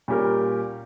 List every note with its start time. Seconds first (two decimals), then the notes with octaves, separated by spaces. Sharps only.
0.08 A#2 G3 C#4 G4 A#4